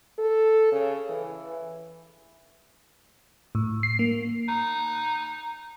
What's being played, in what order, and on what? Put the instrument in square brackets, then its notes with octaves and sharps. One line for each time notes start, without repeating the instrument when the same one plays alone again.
[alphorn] A4
C#3
E3
[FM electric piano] A2
C7
A#3
[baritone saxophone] D#4